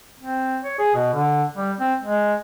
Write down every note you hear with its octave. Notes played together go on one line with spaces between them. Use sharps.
C4
C#5
G#4
B2
D3
G3
C4
G#3